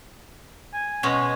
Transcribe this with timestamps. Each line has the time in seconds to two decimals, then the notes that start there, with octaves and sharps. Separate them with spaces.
0.73 G#5
1.03 B2 G#3 C#4